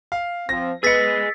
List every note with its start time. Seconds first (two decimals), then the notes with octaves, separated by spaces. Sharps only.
0.12 F5
0.49 F3 C4 A#6
0.83 B3 G#4 B4 D#5 E6 A6 B6 C#7